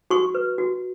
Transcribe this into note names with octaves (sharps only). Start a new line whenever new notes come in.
F#4 C#6
B4
F#4